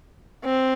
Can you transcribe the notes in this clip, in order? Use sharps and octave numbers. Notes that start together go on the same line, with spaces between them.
C4